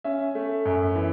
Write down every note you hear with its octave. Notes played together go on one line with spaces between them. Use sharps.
C#4 E5
A3
F#2
E3